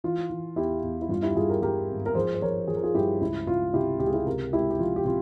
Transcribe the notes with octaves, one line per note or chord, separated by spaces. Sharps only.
E3 F4
E3
E2 E4 G4
E2
E4
G2 F4
E4 G4
G2 F4 G#4
G4 A#4
G2 G4 A#4
G#1
A#4
F3 G#4 C5
C5
F3 A#4 C#5
F3 G#4
A#4
F4 G#4
G2 E4 G4
C#2 E4
C#2 F4
C3 E4 G4
C#2 G4
G#4
E4 G4
C3 G4 A#4
G#3 E4 G4
G4
F3 F4
G4
C3 F4